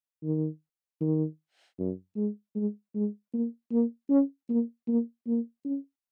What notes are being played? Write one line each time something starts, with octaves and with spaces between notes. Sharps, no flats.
D#3
D#3
F#2
G#3
G#3
G#3
A#3
A#3
C#4
A#3
A#3
A#3
C#4